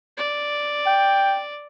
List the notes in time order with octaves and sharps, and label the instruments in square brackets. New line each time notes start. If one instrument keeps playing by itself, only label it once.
[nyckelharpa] D5
[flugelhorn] G5